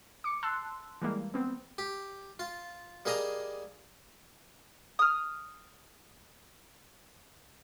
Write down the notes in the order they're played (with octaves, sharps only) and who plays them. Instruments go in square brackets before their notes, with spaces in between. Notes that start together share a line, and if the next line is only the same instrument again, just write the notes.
[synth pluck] D6 C#7
A5 C6 E6 F#6
E3 G3 G#3 A#3
B3 C4
[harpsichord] G4
F4
G3 A#3 G#4 D#5 A#5
[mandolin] D#6 F6